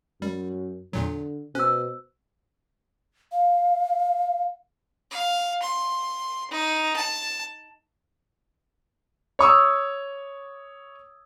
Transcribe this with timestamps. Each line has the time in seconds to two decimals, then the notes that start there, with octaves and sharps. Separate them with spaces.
0.22 F#2 G3
0.93 E2 A#2 D3 F#3
1.55 B2 C#4 C5 E6
3.32 F5
5.11 F5
5.62 C6
6.51 D#4
6.96 A5
9.39 C#5 C#6 D#6 E6